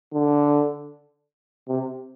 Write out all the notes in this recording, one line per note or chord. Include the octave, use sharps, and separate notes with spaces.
D3
C3